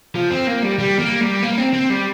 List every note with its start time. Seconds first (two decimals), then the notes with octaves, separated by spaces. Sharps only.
0.15 F3
0.31 C4
0.47 A#3
0.62 G3
0.79 G3
0.99 A#3
1.21 G3
1.43 A#3
1.58 C4
1.73 C4
1.90 G3